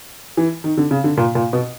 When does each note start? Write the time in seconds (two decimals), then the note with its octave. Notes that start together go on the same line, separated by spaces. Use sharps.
0.37 E3
0.64 D#3
0.77 D3
0.91 C#3
1.04 D3
1.17 A#2
1.35 A#2
1.53 B2